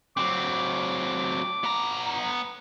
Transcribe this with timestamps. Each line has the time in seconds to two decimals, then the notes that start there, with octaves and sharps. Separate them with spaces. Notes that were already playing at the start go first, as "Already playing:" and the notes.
0.17 F#3 C4 D6
1.64 B3 A#5